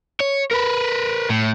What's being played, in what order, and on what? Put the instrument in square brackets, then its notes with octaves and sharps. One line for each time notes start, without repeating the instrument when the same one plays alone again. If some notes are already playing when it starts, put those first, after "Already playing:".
[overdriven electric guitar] C#5
A#4 B4
A2